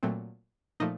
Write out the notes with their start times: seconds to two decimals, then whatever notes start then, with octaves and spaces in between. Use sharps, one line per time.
0.03 A#2 F#3 A3 C4
0.80 A#2 F3 A3 D#4 D#5